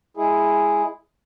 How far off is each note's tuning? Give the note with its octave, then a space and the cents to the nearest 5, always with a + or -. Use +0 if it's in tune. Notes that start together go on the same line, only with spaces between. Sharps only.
G#3 +0 E4 +0 G#4 +0